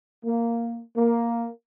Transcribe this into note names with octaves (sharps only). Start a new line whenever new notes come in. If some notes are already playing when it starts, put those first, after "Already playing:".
A#3
A#3